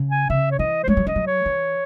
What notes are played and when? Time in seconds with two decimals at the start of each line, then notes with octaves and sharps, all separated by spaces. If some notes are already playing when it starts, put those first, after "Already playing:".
Already playing: C#3
0.11 G#5
0.29 C#3 E5
0.51 C#5
0.59 E3 D#5
0.83 C5
0.88 G#3 C#5
0.97 F#3
1.07 E3 D#5
1.16 F#3
1.26 C#5
1.46 E3